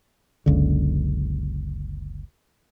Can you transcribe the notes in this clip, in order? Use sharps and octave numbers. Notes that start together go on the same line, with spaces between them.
F#1 C#2 D3